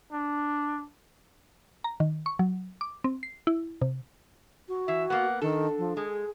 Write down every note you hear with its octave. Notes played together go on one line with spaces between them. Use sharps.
D4
A#5
D#3
C#6
F#3
D6
C4
C7
E4
C3
F#4
E3 E5
A#3 B3 F#5
D#3 D4 A4
F3
G#3 G#4